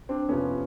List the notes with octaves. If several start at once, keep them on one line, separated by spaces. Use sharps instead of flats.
C4 D4
F2 C3 F3 B3 C#4